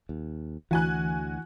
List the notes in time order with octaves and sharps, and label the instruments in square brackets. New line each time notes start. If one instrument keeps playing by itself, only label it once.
[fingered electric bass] D#2
[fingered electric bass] D2 [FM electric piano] E3 [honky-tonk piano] F#4 G#5 F#6